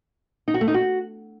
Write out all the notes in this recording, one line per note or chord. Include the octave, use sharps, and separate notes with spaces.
D#4
F#4
A3
D#4
F#4